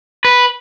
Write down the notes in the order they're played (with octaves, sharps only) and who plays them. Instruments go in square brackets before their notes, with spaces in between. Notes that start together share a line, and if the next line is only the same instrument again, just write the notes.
[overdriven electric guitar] B4